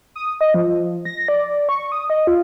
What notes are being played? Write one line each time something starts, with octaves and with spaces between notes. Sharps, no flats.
D#6
D#5
F3
A#6
D5
C#6
D#6
D#5
F4